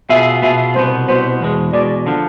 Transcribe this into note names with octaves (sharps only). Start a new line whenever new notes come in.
B2 B3 F4 G#4 E5
B2 B3 F4 G#4 E5
C2 B2 B3 C5
C2 B2 B3 C5
E2 B2 G#3
E2 B2 G#3 D5
D3 F3